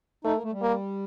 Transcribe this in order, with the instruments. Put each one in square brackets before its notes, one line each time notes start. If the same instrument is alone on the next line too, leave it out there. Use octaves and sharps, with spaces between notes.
[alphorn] A3 [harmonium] D#4
[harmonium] A#3
A3
G3
[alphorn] A#3